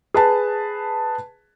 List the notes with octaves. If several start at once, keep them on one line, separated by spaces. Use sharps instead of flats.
G#4 B4 A5